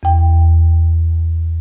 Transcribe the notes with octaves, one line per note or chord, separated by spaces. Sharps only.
E2 G5